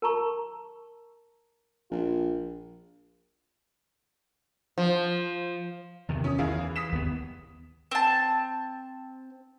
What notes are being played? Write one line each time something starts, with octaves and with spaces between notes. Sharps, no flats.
A#4 A5 A#5 C#6
A#1 F4
F3
E2 C3 D#3
C#4 D#6
E2 D#3 E4 G#4 F5
E3
D#6 B6 E7
D#2 A3 B3
C4 A5